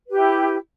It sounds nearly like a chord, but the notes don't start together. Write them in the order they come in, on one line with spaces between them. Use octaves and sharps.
B4 G4 E4